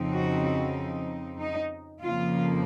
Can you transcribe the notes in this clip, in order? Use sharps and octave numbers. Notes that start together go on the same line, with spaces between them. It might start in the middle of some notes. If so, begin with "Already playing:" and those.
Already playing: F2 C#3 F3 C4 D#4
F#4
D#4
F2 C#3 F3 A#3 F4